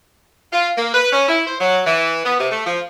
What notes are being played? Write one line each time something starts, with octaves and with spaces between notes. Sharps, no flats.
F4
A#3
B4
C#4
E4
C5
F#3
E3
B3
C3
A3
F3